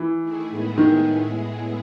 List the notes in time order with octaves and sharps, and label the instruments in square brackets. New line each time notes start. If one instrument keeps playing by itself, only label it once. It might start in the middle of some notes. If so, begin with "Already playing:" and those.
Already playing: [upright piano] E3
[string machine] D#3 A3 E4 G#4
A2 G#3 B3 E4 G#4
[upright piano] D#3